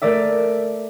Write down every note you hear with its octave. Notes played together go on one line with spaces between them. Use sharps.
A3 A#4 D5 E5